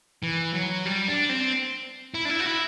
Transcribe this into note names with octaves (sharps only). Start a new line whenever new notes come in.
E3
F#3
G3
D4
C4
E4
D4
E4
F#4
E4